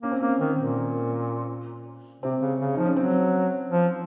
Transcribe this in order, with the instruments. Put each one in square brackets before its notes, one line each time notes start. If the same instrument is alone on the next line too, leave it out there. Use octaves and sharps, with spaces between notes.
[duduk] A#3 [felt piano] C#4
[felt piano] C4
[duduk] A#3 [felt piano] C#4
[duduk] D#3 [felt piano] C4
[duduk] A#2
[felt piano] A#3
[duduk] C3 [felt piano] C4
[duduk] C#3
C#3
[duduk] F3 [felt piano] D#4
[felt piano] C#4
[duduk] F#3 [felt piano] C4
[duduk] F3